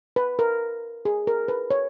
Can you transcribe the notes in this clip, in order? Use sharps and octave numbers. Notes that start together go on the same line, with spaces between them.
B4
A#4
G#4
A#4
B4
C#5